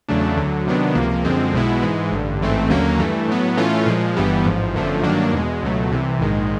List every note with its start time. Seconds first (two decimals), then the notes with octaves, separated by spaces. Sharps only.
0.08 E2 C#3 F#3 A3 D4
0.37 D2 D3 F#3
0.67 C3 D#3 F#3 B3 D4
0.95 C#2 C3 F3 A#3
1.25 F#2 D3 F3 G#3 C4
1.53 B1 B2 G#3 B3 E4
1.82 G#2 E3 G#3
2.12 A1 G2 D3
2.41 A1 G#2 E3 A3 C4
2.70 D#2 D3 F#3 A#3 C#4
3.00 G2 E3 A3
3.28 A2 F#3 B3
3.57 A2 E3 A3 C#4 F4
3.86 A#2 F3 G#3
4.17 G1 G2 E3 G3 B3
4.46 A1 G#2 F3
4.74 G1 F#2 D3 F3 A3
5.03 G2 D#3 F#3 A#3 D4
5.33 E2 B2 G#3
5.62 C#2 B2 F#3 A3
5.90 C2 C3 E3
6.19 A#1 G#2 D#3 G#3